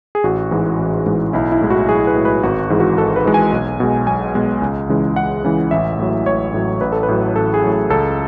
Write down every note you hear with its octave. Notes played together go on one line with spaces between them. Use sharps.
G#4
A1 F#4
G#2 E3 G#3
A1
G#2 E3 G#3
B1 E4
E4
A2 G#3
F#4
B1 G#4
B4
A2 G#3
B4
G#1 F#4
G#2 E3 G#3
F#4
G#1 A4
B4
G#2 E3 G#3
G#5
B1
B2 G#3
B1 G#5
B2 G#3
C#2
C#3 E3 G#3
C#2 F#5
C#3 E3 G#3
A1 E5
A2 F#3
A1 C#5
A2 F#3
A1 B4
A4
B4
A2 F#3
A1 A4
G#4
A2 F#3
G#4
C#2 A4